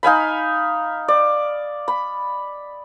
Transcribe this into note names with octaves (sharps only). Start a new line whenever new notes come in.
D#4 F5 G#5 B5
D5
B5